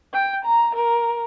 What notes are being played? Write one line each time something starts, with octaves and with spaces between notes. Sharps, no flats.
G5
A#5
A#4